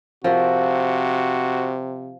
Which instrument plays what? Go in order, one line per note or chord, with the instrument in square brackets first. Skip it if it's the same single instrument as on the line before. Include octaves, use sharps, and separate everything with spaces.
[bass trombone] C3 [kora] F3 A#4 E5 [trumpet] F#4